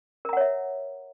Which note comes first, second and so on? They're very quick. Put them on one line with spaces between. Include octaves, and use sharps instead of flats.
A#4 A#5 F#5 C#5 E5